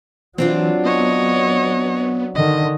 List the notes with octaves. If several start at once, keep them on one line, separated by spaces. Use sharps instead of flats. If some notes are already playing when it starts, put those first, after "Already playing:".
E3 F#3 C4 D4 F4
B3 C#5 D#5
D3 D#3 D#5